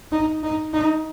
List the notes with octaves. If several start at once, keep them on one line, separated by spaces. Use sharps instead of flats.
D#4
D#4
D#4